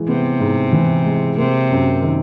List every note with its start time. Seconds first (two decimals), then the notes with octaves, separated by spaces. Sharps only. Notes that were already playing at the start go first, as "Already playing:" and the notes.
Already playing: G#2 E3 G#3
0.08 C3 B3
0.40 G#2
0.73 E3
1.05 G#3
1.37 C3 A#3
1.71 F#2
2.02 D#3